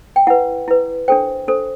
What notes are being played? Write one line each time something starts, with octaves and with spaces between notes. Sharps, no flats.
G5
E4 B4 F#5
E4 B4
D4 A4 C5 G5
D4 A4 C5